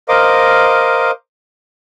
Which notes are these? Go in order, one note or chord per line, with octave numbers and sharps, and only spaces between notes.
A#4 C5 D#5 F5 D6